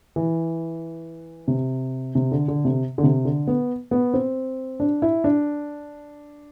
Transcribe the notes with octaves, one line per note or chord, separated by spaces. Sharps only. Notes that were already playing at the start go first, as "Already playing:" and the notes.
E3
C3
C3
D3
D3
C3
D3
C3
D3
B3
B3
C4
D4
E4
D4